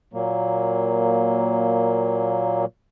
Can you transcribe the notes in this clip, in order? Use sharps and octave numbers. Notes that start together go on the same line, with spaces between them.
A#2 F#3 A#3